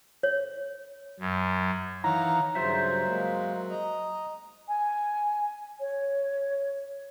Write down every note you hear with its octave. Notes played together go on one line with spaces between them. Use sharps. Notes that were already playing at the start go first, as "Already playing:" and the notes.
C#5
F#2
D#3 E3 C#5 F5 F#5 A#5
G2 C#3 F#3 F4 C5 E5
G#3 A#3
D#5 A#5
G#5
C#5